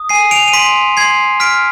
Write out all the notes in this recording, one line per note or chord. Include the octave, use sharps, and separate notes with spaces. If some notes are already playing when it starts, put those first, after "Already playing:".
Already playing: D#6
G#5 C7 D#7
D7 F7
D#7
C6 B6 D7
C6 G#6 C7
F6 B6 D7